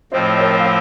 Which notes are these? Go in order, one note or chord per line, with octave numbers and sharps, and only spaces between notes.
A2 F3 C4 C5 D#5
A#4 C#5
F5